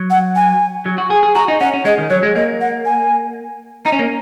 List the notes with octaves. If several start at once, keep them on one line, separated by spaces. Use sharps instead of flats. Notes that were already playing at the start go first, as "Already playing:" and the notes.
Already playing: F#3
F#5
G#5
F#3
F#4
G#4
G#4
F#4 A#5
D#4
C#4 F#5
C#4
G#3 D#5
D#3
F#3 C#5
G#3
A#3 D#5
F#5
G#5
D#4 A#5
C#4
A#3